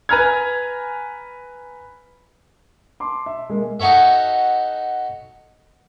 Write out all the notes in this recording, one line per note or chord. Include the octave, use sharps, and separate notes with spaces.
B4 G#5 A#5 B5 F6 G#6
A5 C6 D6
E5
G#3 A#3
D#4 F#4 A4 C#5 E5